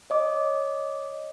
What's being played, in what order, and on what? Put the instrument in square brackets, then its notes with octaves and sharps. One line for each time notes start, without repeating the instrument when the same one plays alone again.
[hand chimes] C#5 D#5 D6